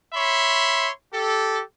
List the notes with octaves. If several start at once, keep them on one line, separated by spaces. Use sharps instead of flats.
C#5 E5 B5 C6
G4 A4